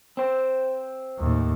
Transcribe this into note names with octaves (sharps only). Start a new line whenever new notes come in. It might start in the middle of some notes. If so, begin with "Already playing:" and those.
C4 C5
D#2 A2